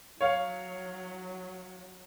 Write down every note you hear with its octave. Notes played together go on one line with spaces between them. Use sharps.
F#3 C#5 F5